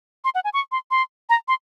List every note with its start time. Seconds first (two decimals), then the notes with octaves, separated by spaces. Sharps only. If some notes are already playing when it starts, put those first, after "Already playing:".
0.25 C6
0.35 F#5
0.44 G#5
0.54 C#6
0.72 C6
0.91 C6
1.30 A#5
1.48 C6